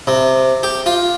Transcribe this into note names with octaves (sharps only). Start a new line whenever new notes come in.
C3
G4
F4